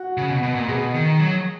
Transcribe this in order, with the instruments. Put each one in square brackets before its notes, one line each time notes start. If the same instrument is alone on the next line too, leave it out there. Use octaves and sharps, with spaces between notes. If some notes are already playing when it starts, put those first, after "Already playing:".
Already playing: [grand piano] F#4
[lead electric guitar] C#3
B2
B2
A#2
[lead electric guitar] B2 [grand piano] G#4
[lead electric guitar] D#3
F#3